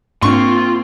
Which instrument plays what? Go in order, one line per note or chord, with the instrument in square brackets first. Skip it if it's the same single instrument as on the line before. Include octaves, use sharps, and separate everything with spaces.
[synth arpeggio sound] G#2 D4 [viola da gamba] A#3 C4 [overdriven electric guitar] F4 C6 [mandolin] C#6